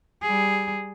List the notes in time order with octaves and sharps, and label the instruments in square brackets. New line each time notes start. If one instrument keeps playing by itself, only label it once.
[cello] G3 G#4